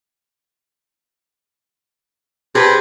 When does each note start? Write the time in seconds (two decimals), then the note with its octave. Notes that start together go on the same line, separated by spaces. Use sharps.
2.55 C3 G#4 B4